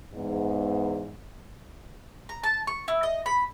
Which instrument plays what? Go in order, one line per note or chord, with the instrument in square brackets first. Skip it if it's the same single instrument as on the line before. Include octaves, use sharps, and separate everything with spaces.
[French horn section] E2 G#2
[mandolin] A#5
A5
C#6
E4
D#5
B5